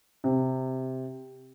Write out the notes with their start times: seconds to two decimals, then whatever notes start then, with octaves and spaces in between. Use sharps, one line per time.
0.24 C3